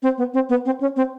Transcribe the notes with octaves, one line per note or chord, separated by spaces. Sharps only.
C4
B3
C4
B3
C4
C#4
C4